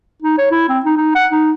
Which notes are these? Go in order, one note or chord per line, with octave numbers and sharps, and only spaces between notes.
D#4
C#5
E4
C4
D#4
D#4
F#5
D#4